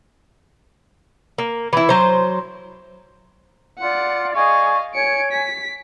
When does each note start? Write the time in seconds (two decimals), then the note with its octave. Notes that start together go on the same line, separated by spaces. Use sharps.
1.38 A#3
1.73 E3 E4
1.89 F#3 C5
3.78 F4 D5 F#5 C#7
4.34 G#4 D5 D#5 F5 C#6
4.94 C#5 G#5 C#7 D7
5.32 B6